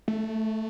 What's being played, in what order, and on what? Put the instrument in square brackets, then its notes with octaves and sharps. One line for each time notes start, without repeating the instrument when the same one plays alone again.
[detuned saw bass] A3